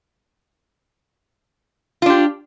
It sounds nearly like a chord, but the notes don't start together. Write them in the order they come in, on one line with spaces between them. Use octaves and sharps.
F4 D4 G4